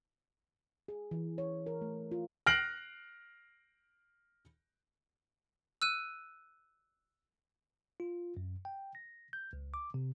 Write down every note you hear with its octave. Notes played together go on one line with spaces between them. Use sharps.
G#4
E3
C#5
A#4
A3
F4
F6 F#6 A#6 C7 D7 F#7
E6 F#6 D#7
F4
F#2
G5
A#6
G6
C#2
D6
C3